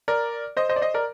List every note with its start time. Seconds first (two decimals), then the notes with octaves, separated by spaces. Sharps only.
0.08 A#4 D5
0.57 C5 D#5
0.69 C5 D#5
0.76 D5
0.81 C5 D#5
0.94 A#4 D5